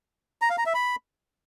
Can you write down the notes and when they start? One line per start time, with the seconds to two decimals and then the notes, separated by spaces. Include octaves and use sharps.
0.42 A#5
0.50 F5
0.58 A#5
0.66 E5
0.74 B5